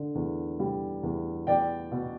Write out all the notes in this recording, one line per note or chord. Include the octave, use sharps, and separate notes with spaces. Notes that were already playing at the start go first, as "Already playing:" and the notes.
Already playing: D3
E2
G3
E2
E2 D5 G5
B2